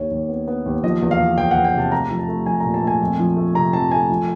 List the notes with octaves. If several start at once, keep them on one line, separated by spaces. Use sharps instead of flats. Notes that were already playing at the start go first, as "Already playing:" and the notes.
Already playing: D#2 D#3 C#5
D#2
B3
B3
D#2
F3 D#5
E2
F5
E2
E2 G5
F#5
E2
G5
C3 A5
A3 A#5
F3
A5
A3
F3 G#5
A#2 A#5
A5
A3 G#5
F2
F3
A3
C3 A#5
F2 A5
A3 G#5
F3